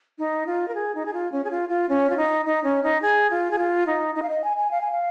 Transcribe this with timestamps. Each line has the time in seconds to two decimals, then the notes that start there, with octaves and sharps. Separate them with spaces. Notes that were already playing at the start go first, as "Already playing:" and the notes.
0.18 D#4
0.47 F4
0.68 A#4
0.75 G#4
0.95 D#4
1.06 G#4
1.13 F4
1.32 C#4
1.44 G#4
1.51 F4
1.69 F4
1.89 C#4
2.10 F4
2.17 D#4
2.46 D#4
2.64 C#4
2.83 D#4
3.02 G#4
3.30 F4
3.51 G#4
3.58 F4
3.87 D#4
4.15 D#4
4.22 F5
4.29 D#5
4.44 G#5
4.57 G#5
4.71 F5
4.81 G#5
4.92 F5